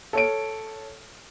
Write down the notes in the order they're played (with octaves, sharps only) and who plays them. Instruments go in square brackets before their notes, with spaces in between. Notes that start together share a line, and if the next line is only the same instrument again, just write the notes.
[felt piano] A4 C#5 D7